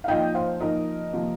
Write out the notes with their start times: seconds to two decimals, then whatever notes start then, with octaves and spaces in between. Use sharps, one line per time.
0.04 F5
0.08 A#2 F3 D#4 D#5 G5
0.35 C5 F5
0.60 A#2 F3 D#4 A#4 D#5
1.13 C3 F3 A#3